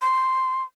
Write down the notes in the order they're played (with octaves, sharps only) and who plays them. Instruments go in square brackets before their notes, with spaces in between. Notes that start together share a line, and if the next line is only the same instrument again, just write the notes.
[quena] C6